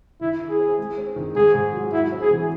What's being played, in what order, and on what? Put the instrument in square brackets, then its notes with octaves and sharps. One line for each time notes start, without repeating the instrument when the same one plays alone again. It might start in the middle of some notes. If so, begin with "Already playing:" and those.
[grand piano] D#3 [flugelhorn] E4
[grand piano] E4
[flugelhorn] G#4
[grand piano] C4
G#3
C4
D#3
[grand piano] G#2 [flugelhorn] G#4
[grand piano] G#2
F#3
[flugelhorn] E4 [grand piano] F#4
[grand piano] C4
[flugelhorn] G#4
[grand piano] E3